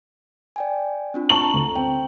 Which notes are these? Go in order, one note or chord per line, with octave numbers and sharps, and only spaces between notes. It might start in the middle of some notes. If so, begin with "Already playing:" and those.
D5 G5 G#5
C4 D4 F4
A5 A#5 C#6 F#7
D2
C4 G5